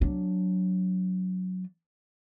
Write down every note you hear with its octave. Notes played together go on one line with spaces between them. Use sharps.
F#3 D4